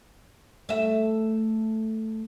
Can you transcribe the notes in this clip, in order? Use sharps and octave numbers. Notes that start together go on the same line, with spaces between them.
A3 E5